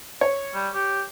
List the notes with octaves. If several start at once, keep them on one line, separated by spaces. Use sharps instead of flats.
C#5
G3
G4